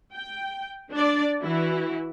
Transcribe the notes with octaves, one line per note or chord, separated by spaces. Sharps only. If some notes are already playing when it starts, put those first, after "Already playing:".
G5
D4 D5
E3 E4 F#4